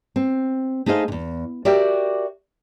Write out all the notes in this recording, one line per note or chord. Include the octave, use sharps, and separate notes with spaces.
C4
A3 D#4 G#4 C5 F5
E2 C3
F#4 G4 A#4 D5 E5 G5